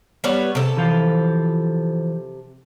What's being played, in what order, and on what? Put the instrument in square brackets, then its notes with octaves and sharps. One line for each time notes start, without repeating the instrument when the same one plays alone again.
[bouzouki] G3 B3 C#5
C3 A4
[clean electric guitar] E3 F3 F4